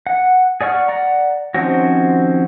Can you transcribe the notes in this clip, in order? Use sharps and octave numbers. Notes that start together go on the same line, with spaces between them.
F#5
G#4 D5 F#5 C#6 F6
D5 F#5 A#5
D#3 F3 C4 C#4 F#4